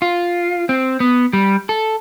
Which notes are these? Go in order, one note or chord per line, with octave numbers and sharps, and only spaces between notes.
F4
C4
B3
G3
A4